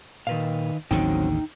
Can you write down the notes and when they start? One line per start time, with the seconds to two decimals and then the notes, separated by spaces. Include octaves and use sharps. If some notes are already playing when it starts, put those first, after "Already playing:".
0.27 A#2 D#3 B4 F5
0.91 A1 D#2 D3 F#3 C4 C#4 D#4 G5